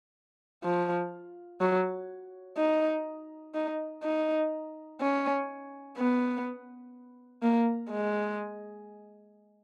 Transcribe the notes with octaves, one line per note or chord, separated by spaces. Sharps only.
F3
F#3
D#4
D#4
D#4
C#4
B3
A#3
G#3